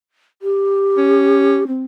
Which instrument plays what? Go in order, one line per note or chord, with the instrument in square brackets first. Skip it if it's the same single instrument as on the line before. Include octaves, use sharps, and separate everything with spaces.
[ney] G4
[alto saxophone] C#4
[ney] C4